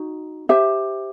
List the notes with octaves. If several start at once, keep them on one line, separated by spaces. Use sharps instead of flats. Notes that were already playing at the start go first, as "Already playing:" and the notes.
Already playing: D#4 F#4
G4 C5 E5